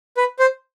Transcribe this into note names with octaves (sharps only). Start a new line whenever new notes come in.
B4
C5